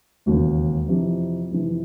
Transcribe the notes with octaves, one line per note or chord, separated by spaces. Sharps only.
E1 D#2 C#3 F#4
F2 C3 E3 G4
F2 C3 E3